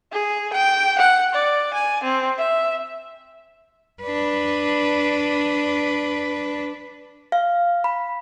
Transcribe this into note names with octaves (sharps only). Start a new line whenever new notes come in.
G#4
G5
F#5
D5
G#5
C4
E5
D4 B4
F5
B5